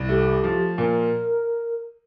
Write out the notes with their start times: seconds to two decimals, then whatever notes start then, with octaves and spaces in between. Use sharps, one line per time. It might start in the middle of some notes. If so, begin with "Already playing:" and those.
Already playing: C2
0.09 A3 G4
0.44 F3
0.78 A#2 A#4